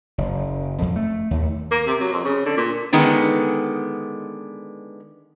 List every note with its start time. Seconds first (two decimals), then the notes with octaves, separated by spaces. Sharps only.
0.18 F#1
0.82 F2
0.96 A3
1.31 D#2
1.71 A#3
1.87 C3
2.00 F#3
2.12 F2
2.25 C#3
2.46 D3
2.57 A#2
2.93 D3 D#3 G#3 B3